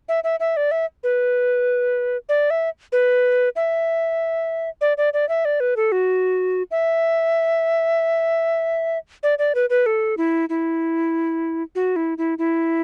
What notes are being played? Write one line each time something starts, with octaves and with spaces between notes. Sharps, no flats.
E5
E5
E5
D5
E5
B4
D5
E5
B4
E5
D5
D5
D5
E5
D5
B4
A4
F#4
E5
D5
D5
B4
B4
A4
E4
E4
F#4
E4
E4
E4